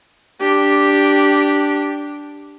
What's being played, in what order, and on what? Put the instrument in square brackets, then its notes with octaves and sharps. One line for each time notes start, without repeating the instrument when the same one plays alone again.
[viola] D4 G4